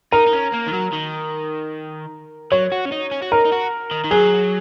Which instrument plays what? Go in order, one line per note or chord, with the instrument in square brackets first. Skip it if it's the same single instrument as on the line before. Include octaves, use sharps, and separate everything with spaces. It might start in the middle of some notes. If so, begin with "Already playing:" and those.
[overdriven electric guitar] D#4 [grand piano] A#4
[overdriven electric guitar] D#4
C#4
A#3
D#3
F#3
D#3
[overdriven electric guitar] F#3 [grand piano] C#5
[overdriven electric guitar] F#4
C#4
D#4
C#4
F#4
[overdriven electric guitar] D#4 [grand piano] A#4
[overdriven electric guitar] D#4
F#4
D#3
D#3
[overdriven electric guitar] F#3 [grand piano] G#4